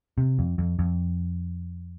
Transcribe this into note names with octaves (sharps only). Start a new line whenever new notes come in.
C3
F2
F2
F2